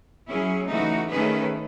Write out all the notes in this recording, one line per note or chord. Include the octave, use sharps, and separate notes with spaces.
F#3 C#4 E4 G#4
C#3 E3 A3 D#4 F#4
D#3 A3 C#4 G#4 B4